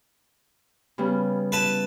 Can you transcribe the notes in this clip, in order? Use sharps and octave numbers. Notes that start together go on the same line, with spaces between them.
C#3 G3 B3
E4 B4 A5